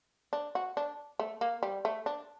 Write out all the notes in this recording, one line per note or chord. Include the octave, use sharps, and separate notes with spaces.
D4
F#4
D4
A3
A#3
G3
A3
D4